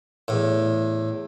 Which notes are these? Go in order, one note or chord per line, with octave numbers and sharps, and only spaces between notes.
E2 A2